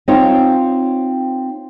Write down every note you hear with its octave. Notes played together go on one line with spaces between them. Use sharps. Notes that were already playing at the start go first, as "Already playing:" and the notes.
C4 D#4 F4 C5 C#5